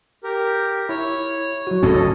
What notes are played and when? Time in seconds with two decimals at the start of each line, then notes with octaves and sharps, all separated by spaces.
0.24 G4 A#4
0.89 E4 C#5
1.67 F#3 F#4
1.83 D1 A2 C#4 A4 D#5